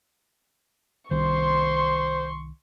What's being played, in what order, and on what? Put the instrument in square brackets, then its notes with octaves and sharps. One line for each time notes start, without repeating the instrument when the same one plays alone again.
[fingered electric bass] C2 D#3 [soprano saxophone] C5 [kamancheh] C6 C#6